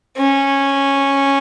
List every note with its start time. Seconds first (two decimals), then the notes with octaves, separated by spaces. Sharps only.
0.17 C#4